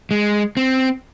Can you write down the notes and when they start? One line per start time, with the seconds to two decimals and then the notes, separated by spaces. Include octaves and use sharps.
0.11 G#3
0.57 C4